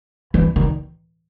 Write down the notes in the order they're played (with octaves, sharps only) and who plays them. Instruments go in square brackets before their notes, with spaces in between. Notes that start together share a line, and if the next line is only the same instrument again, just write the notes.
[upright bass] E3
D#3